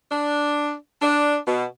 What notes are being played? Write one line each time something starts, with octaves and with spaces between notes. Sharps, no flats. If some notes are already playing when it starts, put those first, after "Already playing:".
D4
D4
B2